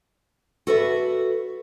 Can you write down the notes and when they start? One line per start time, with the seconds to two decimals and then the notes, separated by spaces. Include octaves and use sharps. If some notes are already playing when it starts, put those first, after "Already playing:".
0.67 F#4 A4 B4 D5 E5